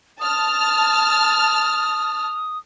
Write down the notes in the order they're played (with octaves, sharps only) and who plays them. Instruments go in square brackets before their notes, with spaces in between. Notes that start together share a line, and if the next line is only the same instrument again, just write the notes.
[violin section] A5 F6 [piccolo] D#6